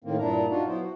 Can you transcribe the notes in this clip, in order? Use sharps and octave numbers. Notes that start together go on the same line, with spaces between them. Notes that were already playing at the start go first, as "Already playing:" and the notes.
A2 D#3 A#3 C4
G2 A#2 D4 E4 A#5
D4 D#4 F4 F#4
F#3 B3 E4 C5
F#4